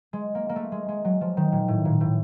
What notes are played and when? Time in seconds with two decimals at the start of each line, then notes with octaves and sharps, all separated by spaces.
0.13 G#3
0.35 A#3
0.49 A#3
0.56 A3
0.72 G#3
0.88 G#3
1.05 F#3
1.21 F3
1.37 D#3
1.52 A#2
1.68 A2
1.85 A#2
2.01 A2